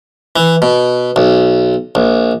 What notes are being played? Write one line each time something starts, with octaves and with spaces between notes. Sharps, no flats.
E3
B2
B1
A#1